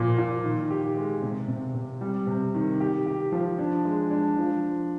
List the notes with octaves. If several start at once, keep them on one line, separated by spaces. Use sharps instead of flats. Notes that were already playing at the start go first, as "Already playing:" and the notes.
Already playing: A#2 F3
A#2
D#3
G4
G#3
C3
C3
C3
G3
C3
D#3
G4
G4
F3
D4
G#3
D4
F3